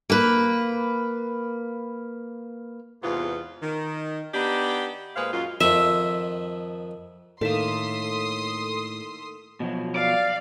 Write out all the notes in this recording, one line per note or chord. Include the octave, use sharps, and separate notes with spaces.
A#3 B4
E2 G#2 C3 B3 F4
D#3
B3 D4 D#4 G4
A#2 G#3 G#4 B4 C5 F5
F#2 F#3 G#3 F4
F2 D#3 F3 E5
A2 D#3 A#3 A4 C6 D#6 B6 E7
B2 F3 F#3
D5 F5